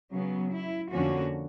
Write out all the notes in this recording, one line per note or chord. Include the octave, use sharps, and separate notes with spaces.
C#3 F#3 B3
E4
F2 D3 F3 A#3 C#4 F#4